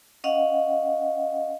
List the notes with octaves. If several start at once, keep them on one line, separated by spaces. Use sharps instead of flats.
C#4 D#5 F5 F#5